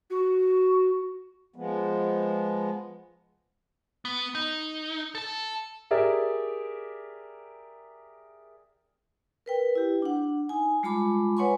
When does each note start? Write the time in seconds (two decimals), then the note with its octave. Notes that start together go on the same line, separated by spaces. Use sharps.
0.10 F#4
1.56 F3 G#3 B3
4.05 B3
4.35 D#4
5.15 A4 A5
5.91 G4 G#4 A#4 D5 E5
9.46 A#4 B4 G5
9.75 E4 G4
10.02 D4 F#5
10.49 D#4 G#5
10.83 G3 G#3 F4 A5 B5 D6
11.37 B4 C#5 F#5 G#5 C6 C#6